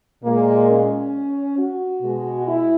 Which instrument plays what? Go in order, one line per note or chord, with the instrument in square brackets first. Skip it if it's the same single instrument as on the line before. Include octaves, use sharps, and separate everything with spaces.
[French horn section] A#2 G#3 A#3
C#4
F#4
B2 G#3
E4